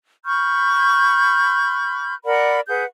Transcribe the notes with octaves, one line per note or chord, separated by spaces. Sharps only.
B5 C#6 F6 G6
A#4 D5 F#5 B5
G#4 B4 F#5 G6